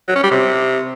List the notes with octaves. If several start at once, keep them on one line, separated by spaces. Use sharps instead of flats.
F#3
C#4
G3
C3